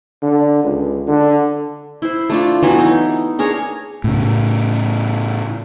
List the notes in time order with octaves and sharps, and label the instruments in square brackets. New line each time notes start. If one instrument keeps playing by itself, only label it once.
[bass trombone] D3
C#2
D3
[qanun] E4 C5
A3 D4 F4
E3 F#3 B3
D#4 E4
D4 G#4 A#4 C#5
[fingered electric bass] A2 C#3